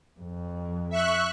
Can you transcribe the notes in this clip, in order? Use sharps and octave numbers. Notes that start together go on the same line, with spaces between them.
F2
E5 C#6 F#6